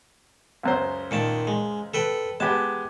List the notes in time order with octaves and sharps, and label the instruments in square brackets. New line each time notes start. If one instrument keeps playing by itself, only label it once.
[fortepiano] C#2 F#2 C5
[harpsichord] A#2 D#3 A5
G#3
A4 B4 G5
[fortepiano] G#3 B3 G4 [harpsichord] A5